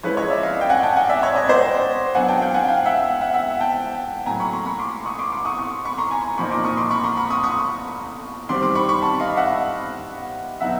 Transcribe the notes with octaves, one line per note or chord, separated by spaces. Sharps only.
F3 G#3 C#4 E4 B4 C#5
C#5 D#5
D5 E5
D#5 F5
G5
F#5 G#5
G5 A5
F#5 G#5
D5 E5
C#5 D#5
C#5 D#5
C5 D5
F#3 B3 D4 F#5 G#5
G5 A5
F5 G5
F#5 G#5
F5 G5
E5 F#5
E5 F#5
E5 F#5
G5 A5
A2 F#3 A#3 G#5 A#5
B5 C#6
A#5 C6
B5 C#6
C6 D6
C#6 D#6
C6 D6
C6 D6
C#6 D#6
C#6 D#6
B5 C#6
A#5 C6
G#5 A#5
A#2 F3 A#3 D#4 B5 C#6
C6 D6
C#6 D#6
C6 D6
B5 C#6
A#5 C6
B5 C#6
C#6 D#6
C#6 D#6
D#3 G3 C4 C6 D6
C6 D6
B5 C#6
B5 C#6
A5 B5
D#5 F5
E5 F#5
B2 F#3 B3 D#4 E5 F#5